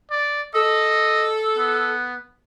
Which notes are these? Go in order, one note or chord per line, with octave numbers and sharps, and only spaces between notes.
D5
A4 D#5
B3